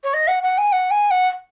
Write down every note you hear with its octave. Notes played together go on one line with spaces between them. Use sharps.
C#5
D#5
F#5
F#5
G#5
F#5
G#5
F#5